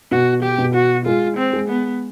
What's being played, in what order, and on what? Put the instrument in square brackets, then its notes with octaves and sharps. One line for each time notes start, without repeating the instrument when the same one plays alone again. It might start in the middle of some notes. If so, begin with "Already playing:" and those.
[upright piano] B2 [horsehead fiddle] F#4
[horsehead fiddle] G4
[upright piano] B2
[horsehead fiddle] F#4
[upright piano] G#3 [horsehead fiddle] F4
[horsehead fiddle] C4
[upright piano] G#3
[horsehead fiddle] B3